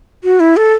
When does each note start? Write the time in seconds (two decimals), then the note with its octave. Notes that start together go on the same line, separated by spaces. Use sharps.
0.24 F#4
0.40 E4
0.57 A4